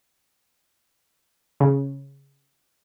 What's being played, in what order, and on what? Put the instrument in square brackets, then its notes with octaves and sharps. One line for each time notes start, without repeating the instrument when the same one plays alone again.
[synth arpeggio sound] C#3